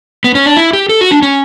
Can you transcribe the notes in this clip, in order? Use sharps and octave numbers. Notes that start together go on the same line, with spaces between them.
B3
C#4
D4
E4
G4
A4
F#4
D4
C#4